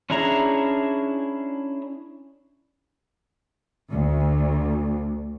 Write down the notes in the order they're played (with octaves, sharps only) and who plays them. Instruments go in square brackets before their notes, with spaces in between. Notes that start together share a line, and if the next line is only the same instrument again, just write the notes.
[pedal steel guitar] C#4 D4 E4 G#4 A#5
[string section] D2